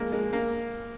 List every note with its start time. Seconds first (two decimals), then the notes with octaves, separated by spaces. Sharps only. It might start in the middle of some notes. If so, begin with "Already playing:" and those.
Already playing: F3 G#3 A#3
0.12 G#3
0.33 A#3